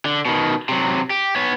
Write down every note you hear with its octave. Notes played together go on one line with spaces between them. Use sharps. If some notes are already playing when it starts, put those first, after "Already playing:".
D3
B2 D#3
C3 F#3
G4
B3 C#5